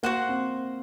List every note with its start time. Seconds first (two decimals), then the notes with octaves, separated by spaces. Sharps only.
0.03 A#3 F#4 C5 F#5
0.29 C4